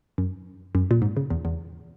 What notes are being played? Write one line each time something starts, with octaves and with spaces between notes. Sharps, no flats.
F#2
F#2
A#2
G#2
C#3
E2
E2